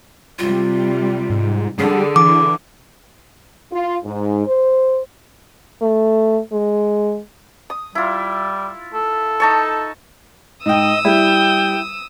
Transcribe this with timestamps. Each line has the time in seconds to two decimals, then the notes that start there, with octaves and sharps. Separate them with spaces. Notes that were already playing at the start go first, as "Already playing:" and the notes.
0.39 C3 G3 F4
1.30 G#2
1.79 D3 G3 G#4
2.16 E3 D6
3.72 F4
4.05 G#2
4.47 C5
5.82 A3
6.53 G#3
7.70 D#6
7.95 G3 E4 F4
8.94 A4
9.40 D#4 A5 C#6
10.66 G#2 D#5 G5 D#6 E6
11.05 G3 E4 G5